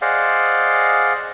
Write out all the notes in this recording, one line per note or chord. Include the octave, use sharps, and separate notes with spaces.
G#4 C5 D5 D#5 F5 F#5